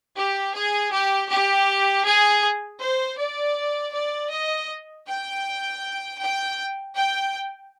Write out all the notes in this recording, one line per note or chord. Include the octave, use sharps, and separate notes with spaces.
G4
G#4
G4
G4
G#4
C5
D5
D5
D#5
G5
G5
G5